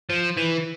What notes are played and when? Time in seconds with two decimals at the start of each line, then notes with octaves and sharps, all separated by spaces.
0.10 F3
0.37 E3